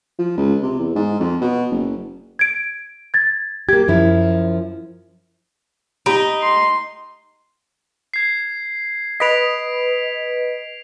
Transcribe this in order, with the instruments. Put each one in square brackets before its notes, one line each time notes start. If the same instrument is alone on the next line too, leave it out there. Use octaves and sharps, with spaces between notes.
[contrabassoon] F3
C#2
C3
E2
G#2
F2
B2
F#1
[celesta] G#6 D7
G#6 A6
[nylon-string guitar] A#3 G4 [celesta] G#6
[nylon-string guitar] F#2 F3 E4
[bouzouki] D#4 [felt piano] G4 B5 D7
[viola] C6
[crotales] G#6 C7
[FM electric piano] B4 D#5 [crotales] B6 D7 F7